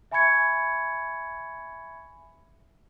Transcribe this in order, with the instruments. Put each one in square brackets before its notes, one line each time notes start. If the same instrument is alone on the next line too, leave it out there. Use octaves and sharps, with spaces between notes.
[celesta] E5 G#5 B5 C#6 G#6 C#7